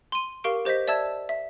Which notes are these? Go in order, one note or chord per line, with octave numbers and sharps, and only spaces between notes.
C6 D#7
G4 A#4 F5 C#6 D7
G4 C5 D#5 G6 B6
D5 E5 A5 E6 G#6
E5